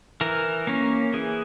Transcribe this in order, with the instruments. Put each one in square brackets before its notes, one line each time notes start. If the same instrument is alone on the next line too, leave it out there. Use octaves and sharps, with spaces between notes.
[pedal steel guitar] E3 A#4
A#3 C#4
E3 G#4